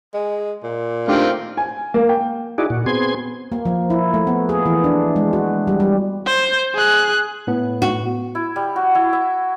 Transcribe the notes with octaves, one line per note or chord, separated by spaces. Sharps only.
G#3
A#2
D#3 A3 C4 D4 F4 G4
G#5
A#3
G5
D#4 E4 F#4 G#4 D5
A#2 F#4
B3 C4 G#4 C6 G#6
A#3
F3
E4
A3
B3
G#4
E3
D4
G#3
F#4
G3
G3
C5
G#4 F#6
A2 B3
F#4
E4
G3
F#4
E4
E5